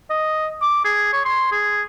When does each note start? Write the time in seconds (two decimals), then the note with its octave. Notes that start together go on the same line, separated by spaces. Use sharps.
0.10 D#5
0.61 D6
0.85 G#4
1.13 C#5
1.25 C6
1.52 G#4